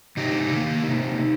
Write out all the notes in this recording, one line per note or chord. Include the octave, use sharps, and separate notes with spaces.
C3 D#4 G4
D#3 A#3
C3